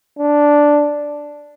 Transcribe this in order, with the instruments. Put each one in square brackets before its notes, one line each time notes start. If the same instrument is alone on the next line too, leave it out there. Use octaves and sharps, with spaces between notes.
[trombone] D4